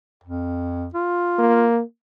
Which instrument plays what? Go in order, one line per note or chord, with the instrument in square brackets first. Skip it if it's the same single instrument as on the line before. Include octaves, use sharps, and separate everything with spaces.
[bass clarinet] F2
F4
[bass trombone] A#3